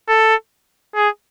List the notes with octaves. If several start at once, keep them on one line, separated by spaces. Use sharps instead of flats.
A4
G#4